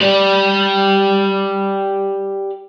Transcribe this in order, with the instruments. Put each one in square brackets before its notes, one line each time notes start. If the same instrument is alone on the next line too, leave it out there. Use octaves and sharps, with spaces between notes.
[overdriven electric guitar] G4 D5